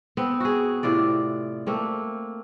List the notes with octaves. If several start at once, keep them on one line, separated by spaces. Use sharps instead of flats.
B3 C4
F#4 G#4
A2 C3 F4 D5
A3 A#3 C4